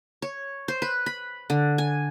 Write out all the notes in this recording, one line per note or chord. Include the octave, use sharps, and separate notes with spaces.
C#5
C5
B4
B5
D3
G#5